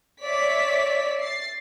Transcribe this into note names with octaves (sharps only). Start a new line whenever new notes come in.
C#5 D5 E5 B6
A6 C7